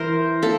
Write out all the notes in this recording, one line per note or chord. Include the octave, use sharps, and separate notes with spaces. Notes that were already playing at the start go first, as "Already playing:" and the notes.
Already playing: E3 A#4 C5
A#3 A4